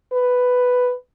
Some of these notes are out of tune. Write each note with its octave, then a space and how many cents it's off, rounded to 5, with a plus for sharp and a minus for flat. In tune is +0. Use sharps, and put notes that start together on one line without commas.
B4 +5